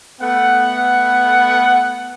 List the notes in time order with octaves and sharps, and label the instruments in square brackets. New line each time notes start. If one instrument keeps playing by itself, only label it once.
[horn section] A3 B3 F#5